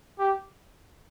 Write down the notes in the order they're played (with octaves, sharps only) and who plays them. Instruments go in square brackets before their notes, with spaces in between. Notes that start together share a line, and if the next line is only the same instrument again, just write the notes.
[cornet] G4